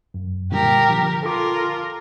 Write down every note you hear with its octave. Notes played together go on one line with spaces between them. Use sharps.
F#2
A#2 D3 G3 G4 A#4
D3 F3
F4 A4 A#4 D6